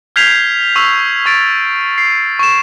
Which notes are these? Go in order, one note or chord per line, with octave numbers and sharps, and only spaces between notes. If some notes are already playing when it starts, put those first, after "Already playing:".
F6 G6 G#6 B6 C7 F7
C#6 E6 F7
C#6 A6 D7
C7
C#6 E7